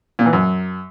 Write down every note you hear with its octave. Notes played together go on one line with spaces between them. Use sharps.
A#2
E3
F#2